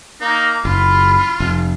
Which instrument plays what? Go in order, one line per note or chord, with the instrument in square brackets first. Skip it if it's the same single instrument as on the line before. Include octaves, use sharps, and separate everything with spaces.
[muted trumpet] A#3 [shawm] D#4
[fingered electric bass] F#1 [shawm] F4 [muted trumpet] B5
[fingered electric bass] F1